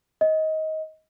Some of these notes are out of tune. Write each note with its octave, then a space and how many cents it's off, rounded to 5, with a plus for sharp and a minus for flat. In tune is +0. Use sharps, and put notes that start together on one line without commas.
D#5 +20